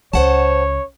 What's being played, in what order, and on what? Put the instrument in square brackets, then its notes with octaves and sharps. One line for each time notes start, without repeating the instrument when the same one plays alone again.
[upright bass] C#2 [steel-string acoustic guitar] C5 F#5 A5 [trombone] C#5